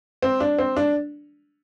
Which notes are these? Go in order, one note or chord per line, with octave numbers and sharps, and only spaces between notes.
C4
D4
C4
D4